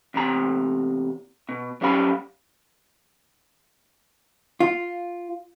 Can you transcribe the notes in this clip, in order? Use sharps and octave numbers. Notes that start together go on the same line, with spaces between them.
E2 C3 A#5
B2
F#3 G3 C#4 F5 B5
F4